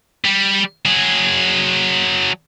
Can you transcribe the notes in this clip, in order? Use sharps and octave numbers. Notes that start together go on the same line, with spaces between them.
G3
F#3 G#4